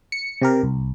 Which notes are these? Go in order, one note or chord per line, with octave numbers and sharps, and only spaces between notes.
C#7
C3 G4 A#4
C2